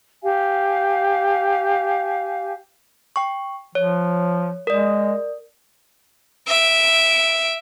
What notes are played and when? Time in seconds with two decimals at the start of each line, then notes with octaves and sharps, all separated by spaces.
0.22 G4 F5 G#5
3.16 G5 C#6
3.75 F3 C#5
4.67 G#3 A#4 D5
6.47 E5 D7